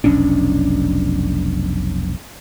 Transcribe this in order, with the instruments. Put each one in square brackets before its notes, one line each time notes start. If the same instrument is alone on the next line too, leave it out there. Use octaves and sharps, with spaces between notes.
[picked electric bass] F1 B1 C#4 D4